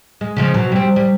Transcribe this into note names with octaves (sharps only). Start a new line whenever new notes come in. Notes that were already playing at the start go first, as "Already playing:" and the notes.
G#3
C#3 F3 G#3
B2 F#3
G3 C4
G3